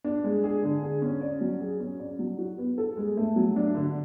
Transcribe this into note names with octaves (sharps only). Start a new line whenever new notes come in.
D4
G#3
G#4
D3
G#4
C#4
D5
F#3
G#4
C#4
D5
F#3
F#4
B3
A4
G#3
A3
F#3
D4
D3